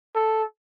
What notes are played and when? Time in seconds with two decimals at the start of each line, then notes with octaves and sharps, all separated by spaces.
0.15 A4